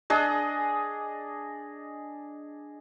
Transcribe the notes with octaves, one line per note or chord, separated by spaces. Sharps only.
D4 G#4 D#5